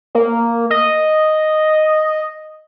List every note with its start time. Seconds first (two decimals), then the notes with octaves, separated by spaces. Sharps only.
0.15 A#3
0.70 D#5